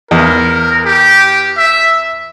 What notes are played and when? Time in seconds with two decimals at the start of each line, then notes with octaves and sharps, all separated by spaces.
0.11 E2 A#4
0.85 G4
1.58 E5